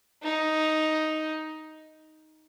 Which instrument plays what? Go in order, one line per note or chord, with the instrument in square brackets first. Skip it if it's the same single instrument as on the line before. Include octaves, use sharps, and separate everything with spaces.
[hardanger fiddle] D#4